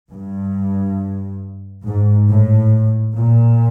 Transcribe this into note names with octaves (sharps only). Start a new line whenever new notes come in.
G2
G#2
A2
A#2